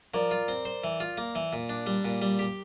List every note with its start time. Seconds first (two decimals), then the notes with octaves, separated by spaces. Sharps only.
0.14 F3 A#4 D5
0.31 F4
0.48 C4
0.65 C5
0.84 E3
1.00 F4
1.18 A#3
1.35 E3
1.53 A#2
1.69 D4
1.86 G3
2.05 A#2
2.22 G3
2.39 G4